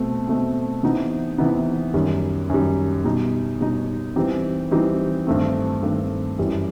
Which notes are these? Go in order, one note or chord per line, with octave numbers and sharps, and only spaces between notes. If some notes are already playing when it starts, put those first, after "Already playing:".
Already playing: B2 A3 C4
B2 A3 C4
C3 E3 B3 D#4
C3 E3 B3 D#4
F#2 D#3 G3
F#2 D#3 G3
B2 G3 D#4
B2 G3 D#4
E3 G3 C4 D#4 G4
E3 G3 C4 D#4 G4
G2 D#3 A3 C4
G2 D#3 A3 C4
F#2 E3 G3